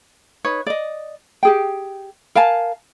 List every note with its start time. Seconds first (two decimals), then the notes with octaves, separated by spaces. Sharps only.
0.45 D#4 B4 C#5
0.67 D5 D#5
1.43 G4 G#4 G5
2.35 A#4 F5 G#5 A5